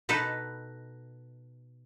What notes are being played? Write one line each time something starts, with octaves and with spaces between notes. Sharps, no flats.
B2 D#4 A4 B4